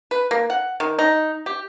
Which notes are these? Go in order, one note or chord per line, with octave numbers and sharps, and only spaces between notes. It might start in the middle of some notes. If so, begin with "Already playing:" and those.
B4
A#3
F#5
D#3
D#4
G4